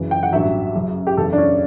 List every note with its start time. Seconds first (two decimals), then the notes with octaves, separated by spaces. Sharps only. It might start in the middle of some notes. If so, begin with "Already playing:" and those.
Already playing: F#1 F#2 C#3 E3
0.11 G5
0.23 F#5
0.32 A1 G2 F#3 E5
0.75 F#1 F#2 C#3
1.07 G4
1.17 F#1 E2 C#3 A4
1.33 D4
1.38 C#4